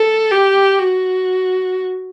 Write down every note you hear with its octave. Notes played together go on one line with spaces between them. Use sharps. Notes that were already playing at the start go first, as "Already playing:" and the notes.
Already playing: A4
G4
F#4